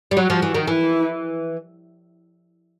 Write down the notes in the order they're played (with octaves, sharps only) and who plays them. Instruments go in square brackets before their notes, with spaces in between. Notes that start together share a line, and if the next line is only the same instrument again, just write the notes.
[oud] G3
[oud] F#3 [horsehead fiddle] F#4
[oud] F3
E3
D#3
[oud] E3 [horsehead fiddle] E4